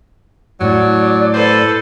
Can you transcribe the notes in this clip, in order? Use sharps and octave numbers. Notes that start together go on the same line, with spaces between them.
A2 F#3 D5
A4 B4 C5